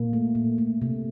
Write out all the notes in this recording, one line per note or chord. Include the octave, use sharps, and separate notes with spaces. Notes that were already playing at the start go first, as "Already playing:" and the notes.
Already playing: A#2 A#3
A3
A#2
A3
C3